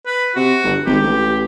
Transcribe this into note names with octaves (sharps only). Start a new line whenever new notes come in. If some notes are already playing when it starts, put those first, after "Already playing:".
B4
C3 F#4
G1
G#1 G4
A1